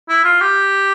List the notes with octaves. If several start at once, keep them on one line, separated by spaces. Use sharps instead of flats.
E4
F4
G4